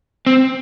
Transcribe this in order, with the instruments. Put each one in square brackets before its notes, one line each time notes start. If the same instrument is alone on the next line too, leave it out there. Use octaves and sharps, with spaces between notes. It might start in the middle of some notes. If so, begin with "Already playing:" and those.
[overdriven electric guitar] C4